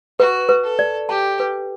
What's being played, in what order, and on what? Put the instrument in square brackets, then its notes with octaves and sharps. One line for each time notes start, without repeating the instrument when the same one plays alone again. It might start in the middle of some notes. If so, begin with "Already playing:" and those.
[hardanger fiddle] F#4 [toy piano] B4
[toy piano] B4
[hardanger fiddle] A4
[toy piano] D5
[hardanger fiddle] G4 [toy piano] A5
[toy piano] B4